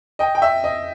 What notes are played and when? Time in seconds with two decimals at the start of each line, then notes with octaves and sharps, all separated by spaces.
0.19 D#5 G5
0.35 G5
0.42 E5
0.64 D#5